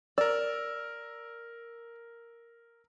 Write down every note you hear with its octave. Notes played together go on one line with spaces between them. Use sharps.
A#4 D5 E6